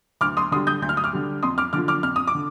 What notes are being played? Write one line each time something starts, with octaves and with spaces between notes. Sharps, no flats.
D2 D6 F6
C6 D#6
D3 G3 C6 D#6
D#6 G6
D2 G6
F6
D#6
D6 F6
D3 G3
F2 C6 D#6
D6 F6
D3 F3 D6 F6
D6 F6
F2 F6
D#6
D6
D3